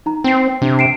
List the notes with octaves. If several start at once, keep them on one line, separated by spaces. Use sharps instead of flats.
D#4 A#5
C4 G5 C7
C3 D4
C7 D7 E7